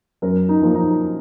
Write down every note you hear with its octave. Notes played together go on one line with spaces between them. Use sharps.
F#2 A#4
D#4
F3 A#3
D#4